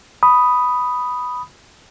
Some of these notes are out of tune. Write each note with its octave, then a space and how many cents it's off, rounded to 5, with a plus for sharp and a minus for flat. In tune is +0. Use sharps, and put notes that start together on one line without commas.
B5 +0 D#6 +0